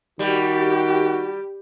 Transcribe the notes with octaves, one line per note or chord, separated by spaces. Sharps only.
D#3 G3 F#4 G4